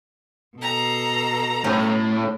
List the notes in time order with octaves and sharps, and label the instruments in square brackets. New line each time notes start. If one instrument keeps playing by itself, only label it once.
[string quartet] B2 A4 A#5
[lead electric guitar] A2 [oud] C#4